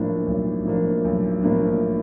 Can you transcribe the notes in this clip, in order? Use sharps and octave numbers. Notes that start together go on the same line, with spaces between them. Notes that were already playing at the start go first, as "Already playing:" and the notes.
Already playing: B1 A2 F3 A#3 D4
B1
A2 F3 A#3 D4
B1
A2 F3 A#3 D4